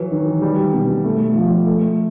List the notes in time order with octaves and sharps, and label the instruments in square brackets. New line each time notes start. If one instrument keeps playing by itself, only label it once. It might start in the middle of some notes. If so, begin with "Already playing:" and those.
Already playing: [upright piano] E3 F#3
D#3
G3
B2
A3
F3
A3